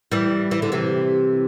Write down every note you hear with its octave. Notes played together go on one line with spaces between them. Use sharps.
E3 G3
E3
D3
C3 E3